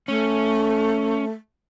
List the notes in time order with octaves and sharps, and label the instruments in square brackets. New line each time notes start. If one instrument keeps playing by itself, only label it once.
[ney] A3 [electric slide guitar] C#4